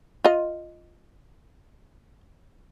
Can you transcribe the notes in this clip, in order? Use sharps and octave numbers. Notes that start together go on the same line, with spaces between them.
F4 D#5